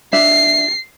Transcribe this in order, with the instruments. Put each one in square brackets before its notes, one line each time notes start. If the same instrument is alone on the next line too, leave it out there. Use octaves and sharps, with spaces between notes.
[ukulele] D4 E5 [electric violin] C7